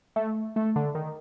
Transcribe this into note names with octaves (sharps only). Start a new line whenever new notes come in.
A3
A3
D3
D#3